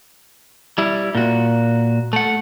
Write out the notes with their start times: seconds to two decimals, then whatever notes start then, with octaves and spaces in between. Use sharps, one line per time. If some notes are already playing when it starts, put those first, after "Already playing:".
0.78 G3 E4
1.15 A#2 F#4
2.13 A3 F#5